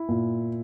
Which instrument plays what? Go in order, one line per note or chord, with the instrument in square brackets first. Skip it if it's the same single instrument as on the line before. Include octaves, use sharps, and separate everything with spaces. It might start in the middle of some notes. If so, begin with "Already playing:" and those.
Already playing: [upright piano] E4
A#2